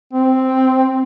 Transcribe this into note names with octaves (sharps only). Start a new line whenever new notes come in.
C4